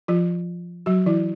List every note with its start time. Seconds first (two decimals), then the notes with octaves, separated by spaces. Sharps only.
0.08 F3 F4
0.86 F#3 F#4
1.06 E3 E4